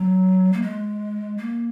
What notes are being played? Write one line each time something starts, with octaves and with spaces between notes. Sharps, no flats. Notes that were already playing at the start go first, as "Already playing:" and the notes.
Already playing: F#3
A#3
G#3
A#3